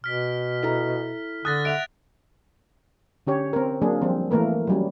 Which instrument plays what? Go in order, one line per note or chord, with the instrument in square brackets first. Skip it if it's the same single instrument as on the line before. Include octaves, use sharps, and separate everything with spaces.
[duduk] B2 [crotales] F6 B6
[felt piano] E4 A4 A#5
[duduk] D3 [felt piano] D#6 [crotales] F#6 A6 A#6
[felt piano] E5 F#5 [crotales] D7 F7
[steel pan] D3 C#4 G4 C#5
C4 A#4
F#3 A#3 D4 G#4
F3 G3 C4
E3 A3 A#3 A#4 B4
F#3 G3 C#4